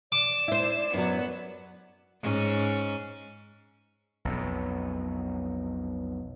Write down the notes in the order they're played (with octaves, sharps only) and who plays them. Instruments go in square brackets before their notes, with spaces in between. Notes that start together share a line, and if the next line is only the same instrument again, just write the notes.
[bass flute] D5 [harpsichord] D6 [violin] E7
[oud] E4 C5
[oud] F#2 F#3 [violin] B3
[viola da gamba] G#2 C#4
[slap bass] B1 F2 B2